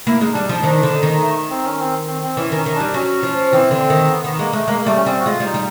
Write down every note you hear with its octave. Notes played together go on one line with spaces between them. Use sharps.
A#3 E4
G#3 D#4
G3 D4
F3 D#4
D#3 D4
D3
D#4
D#3
A3
C4
C#4
C4
C4
C4
E3 C#4
D#3 C#4
D#3
D4
G3
F#3 C#4
F3
E3 C4
D3
D#3
B3
D#3 B3
G#3 A#3
G#3 A3
G#3 A#3
A#3
G3 A3
C#4
G3 C4
F#4
G#3 F4
G3 D#4
G3